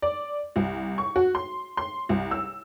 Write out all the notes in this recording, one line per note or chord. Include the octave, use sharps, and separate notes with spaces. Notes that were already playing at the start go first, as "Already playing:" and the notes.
D5
C2
C#6
F#4
C6
C6
C2
E6